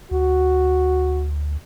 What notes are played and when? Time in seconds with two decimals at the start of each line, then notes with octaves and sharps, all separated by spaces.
0.11 D2 F#4